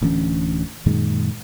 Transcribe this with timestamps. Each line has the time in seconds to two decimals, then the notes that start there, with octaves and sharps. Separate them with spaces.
0.02 D1 D2 E3 C#4
0.86 F#2 A#2 D#3 G#3